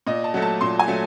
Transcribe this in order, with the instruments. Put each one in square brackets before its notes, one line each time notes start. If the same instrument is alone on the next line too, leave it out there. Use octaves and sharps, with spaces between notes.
[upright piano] A#2 D#5
A5
F#3 A3
A5
A#2 C6
G#5
F#3 A3